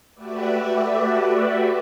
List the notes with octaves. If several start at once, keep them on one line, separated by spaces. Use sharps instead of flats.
A3 F#4 G4 B4 D5 E5